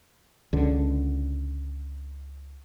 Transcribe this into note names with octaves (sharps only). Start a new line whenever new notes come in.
C#2 D3